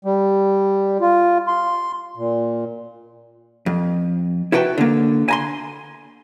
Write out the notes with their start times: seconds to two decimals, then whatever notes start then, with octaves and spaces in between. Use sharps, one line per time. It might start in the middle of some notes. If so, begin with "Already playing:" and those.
0.05 G3
1.01 F4
1.47 C6
2.17 A#2
3.66 F2
4.52 E4 F#4 B4 G5 A5
4.78 D3 A#3
5.28 G#5 A#5 C6